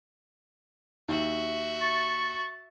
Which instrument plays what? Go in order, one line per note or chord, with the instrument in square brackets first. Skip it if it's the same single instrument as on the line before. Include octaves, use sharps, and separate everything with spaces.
[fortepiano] D#2 [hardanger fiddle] F#4 E5
[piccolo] C#6 [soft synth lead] A6